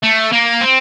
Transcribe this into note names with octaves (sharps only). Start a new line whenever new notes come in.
A3
A#3
C4